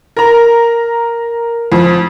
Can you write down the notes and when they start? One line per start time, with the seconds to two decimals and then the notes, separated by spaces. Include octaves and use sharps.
0.17 A#4 A#5
1.72 F2